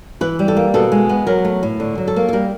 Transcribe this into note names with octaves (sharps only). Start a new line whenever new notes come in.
E3 B4
G3
A4
A#3
B2 A4
G#3
B3
F#3 A#4
A3
A2
D3
F#3
A4
A#3
A4
G3 A#4